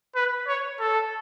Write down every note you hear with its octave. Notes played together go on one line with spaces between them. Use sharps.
B4
C#5
A4